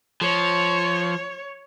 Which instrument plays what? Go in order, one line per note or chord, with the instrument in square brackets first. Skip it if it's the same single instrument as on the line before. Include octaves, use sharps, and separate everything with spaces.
[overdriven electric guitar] F3 [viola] C#5